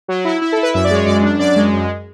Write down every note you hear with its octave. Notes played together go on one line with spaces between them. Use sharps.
F#3
E4
E4
A4
E4
B4
F#2 E5
D5
G#3 C#5
F#2 D5
D4
F#2 D5
G#3
F#2